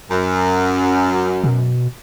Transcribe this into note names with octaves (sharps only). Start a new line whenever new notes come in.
F#2
B2